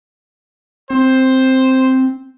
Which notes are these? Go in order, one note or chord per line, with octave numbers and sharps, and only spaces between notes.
C4 C5